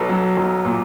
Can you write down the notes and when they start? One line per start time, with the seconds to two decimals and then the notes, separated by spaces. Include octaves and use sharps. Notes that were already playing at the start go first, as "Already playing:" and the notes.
Already playing: B1 A4 B4
0.09 F#3
0.37 B1
0.65 A#2